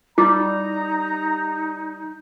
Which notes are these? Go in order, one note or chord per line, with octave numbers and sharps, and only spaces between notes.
G3 D#4 E4 A#5 D6